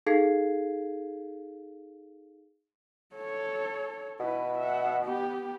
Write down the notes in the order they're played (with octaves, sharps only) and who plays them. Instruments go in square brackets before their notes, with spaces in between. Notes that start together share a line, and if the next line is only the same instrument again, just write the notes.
[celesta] D#4 G#4 A4 F5 G#6 C7
[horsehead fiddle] A4 C#5
[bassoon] B2 [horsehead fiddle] E4 B4
[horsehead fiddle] E5 F#5
B3 G4